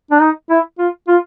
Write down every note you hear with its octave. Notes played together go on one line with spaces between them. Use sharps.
D4
D#4
E4
F4
F4